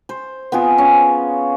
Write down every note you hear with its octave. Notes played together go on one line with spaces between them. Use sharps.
C5
B3 C4 F4 G#4
C#4